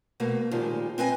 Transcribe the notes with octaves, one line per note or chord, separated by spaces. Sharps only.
B2 A3 A#3
A#2 D#3 F3 G3 G#3
C4 B4 D#5 G#5